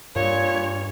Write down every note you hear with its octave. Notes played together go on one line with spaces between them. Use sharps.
G2 A#2 C#5